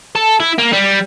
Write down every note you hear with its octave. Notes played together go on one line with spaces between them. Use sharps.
A4
E4
A#3
G3